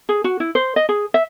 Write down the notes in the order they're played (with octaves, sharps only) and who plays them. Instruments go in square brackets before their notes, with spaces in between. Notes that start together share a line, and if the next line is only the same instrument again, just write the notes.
[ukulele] G#4
F#4
E4
C5
D#5
G#4
E5